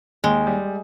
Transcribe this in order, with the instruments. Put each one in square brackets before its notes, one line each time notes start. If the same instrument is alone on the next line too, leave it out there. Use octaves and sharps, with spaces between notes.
[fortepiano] D#2 [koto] G#3
[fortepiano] G3